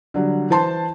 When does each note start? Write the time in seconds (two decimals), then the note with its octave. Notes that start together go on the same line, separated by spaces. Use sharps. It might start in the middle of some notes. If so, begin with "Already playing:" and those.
0.14 D3 F#3 G3
0.50 E3 C5 A5 C6